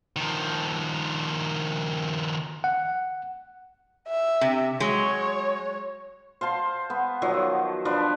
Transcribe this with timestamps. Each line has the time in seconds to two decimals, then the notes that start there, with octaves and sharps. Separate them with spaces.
0.16 D#3 F3
2.64 F#5
4.08 E5
4.41 C3
4.80 F#3 G#3 C#5
6.41 C5 F5 A5 C6
6.90 B3
7.22 D#3 F3 F#3
7.85 F3 D4 B4